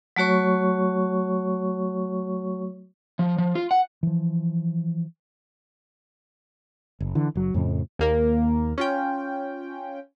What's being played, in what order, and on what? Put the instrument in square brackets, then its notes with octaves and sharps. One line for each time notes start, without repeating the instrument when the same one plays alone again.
[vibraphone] F#3 A3 F#4 C#5 C#6
[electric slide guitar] F3
F3
F4
F#5
[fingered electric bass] E3 F3
[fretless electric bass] F#1
D3 E3
F#1 F#3
F2 A2 C#3 F3
[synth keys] D#2 A#3 A#4
C#4 F4 G5